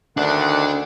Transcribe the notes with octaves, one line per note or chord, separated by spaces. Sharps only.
D2 D#3 D4 D5 F#5